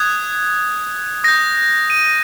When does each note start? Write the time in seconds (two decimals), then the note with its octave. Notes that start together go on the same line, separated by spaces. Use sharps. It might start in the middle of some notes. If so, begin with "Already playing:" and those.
Already playing: D#6 F#6 G#6
1.24 D#6 G6 A#6
1.90 D#7